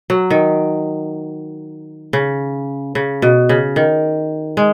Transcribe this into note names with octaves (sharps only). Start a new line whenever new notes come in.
F#3
D#3
C#3
C#3
B2
C#3
D#3
G#3